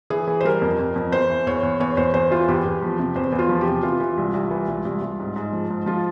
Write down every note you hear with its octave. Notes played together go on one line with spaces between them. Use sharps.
E3 G#4
E3
C5
G3 A#4
F2
F2
F2
E2 C5
E3
E2 C#5
E2
E2 C#5
E2 C5
E2 C5
E3 F4
E2 G4
E2
F3
C3
E2 C5
E2
F4
F3
G4
C3
E3 F4
E3
C2
C2
E3
C2
C2
C2
G#2
G#2
F3
G#2
F3 F4